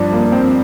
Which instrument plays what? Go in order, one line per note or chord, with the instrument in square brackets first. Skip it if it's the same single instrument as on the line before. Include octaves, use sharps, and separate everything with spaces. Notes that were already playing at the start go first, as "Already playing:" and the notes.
Already playing: [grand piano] G2 F3 [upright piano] D4
[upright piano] A#3
C4